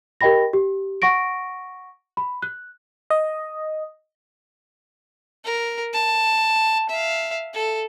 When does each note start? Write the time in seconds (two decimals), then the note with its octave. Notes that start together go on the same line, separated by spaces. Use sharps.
0.21 G4 A#4 D#5 G5 B5 A#6
0.53 G4
1.02 F#5 C#6 A#6 D7
2.17 B5
2.42 F#6
3.10 D#5
5.45 A#4
5.94 A5
6.89 E5 F5
7.54 A4